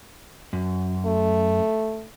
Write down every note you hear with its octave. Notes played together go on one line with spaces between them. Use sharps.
F#2
A3